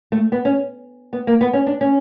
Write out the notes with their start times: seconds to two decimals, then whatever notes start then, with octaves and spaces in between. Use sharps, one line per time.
0.12 A3
0.32 B3
0.45 C#4
1.13 B3
1.27 A#3
1.41 B3
1.53 C#4
1.67 D4
1.81 C#4